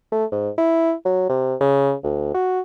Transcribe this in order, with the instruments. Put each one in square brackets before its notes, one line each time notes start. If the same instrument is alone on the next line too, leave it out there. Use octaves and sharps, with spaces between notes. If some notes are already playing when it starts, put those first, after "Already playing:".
[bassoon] A3
G#2
E4
F#3
C3
C#3
D2
F#4